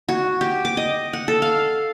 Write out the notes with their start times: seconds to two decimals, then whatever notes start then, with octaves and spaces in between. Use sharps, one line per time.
0.09 F#4
0.41 G4
0.65 D6
0.77 D#5
1.13 F#5
1.28 A4
1.42 F5